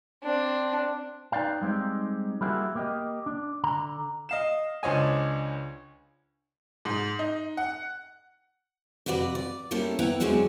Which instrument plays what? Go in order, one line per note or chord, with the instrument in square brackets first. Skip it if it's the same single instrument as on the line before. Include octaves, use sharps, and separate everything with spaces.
[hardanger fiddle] C4 D4
[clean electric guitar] D#4 B4 D5 F5 G5
G3 G#3 C4 D#4 G4
G3 A#3 C4 E4 F#4 G#4
A#3 G4 D#5
D4
D3 A#5
[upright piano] D#5 F5 E7
C#2 D4 C5 C#5 D#5 G#5
[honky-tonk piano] G#2
D#4
F#5
[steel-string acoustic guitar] F2 C3 F#4 B4 D5
D5
G3 A#3 C#4 E4 A4
B3 E4 B4 F#5 G5 A#5
E2 D3 F#3 G#3 C4 C#4